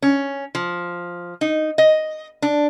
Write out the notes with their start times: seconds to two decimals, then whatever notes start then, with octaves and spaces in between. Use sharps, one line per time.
0.02 C#4
0.55 F3
1.41 D#4
1.78 D#5
2.42 D4